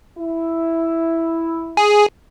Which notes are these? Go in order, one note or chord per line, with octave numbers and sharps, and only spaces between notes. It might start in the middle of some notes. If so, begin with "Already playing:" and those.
E4
G#4